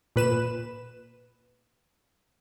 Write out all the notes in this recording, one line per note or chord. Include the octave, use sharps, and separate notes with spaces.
A#2 B4 E7